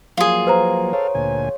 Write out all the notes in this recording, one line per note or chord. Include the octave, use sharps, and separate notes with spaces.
F3 F#3 A#3 F4 G#4
B4 C5 A#5
A4 C#5 F5
D2 A#2 G#5